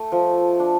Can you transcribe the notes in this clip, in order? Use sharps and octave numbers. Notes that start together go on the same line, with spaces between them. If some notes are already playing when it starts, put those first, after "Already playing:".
Already playing: A3
F3
D4